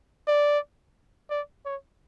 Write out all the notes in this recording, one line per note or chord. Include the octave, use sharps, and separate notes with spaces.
D5
D5
C#5